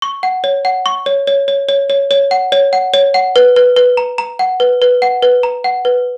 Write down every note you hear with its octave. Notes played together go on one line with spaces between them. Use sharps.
C#6
F#5
C#5
F#5
C#6
C#5
C#5
C#5
C#5
C#5
C#5
F#5
C#5
F#5
C#5
F#5
B4
B4
B4
A#5
A#5
F#5
B4
B4
F#5
B4
A#5
F#5
B4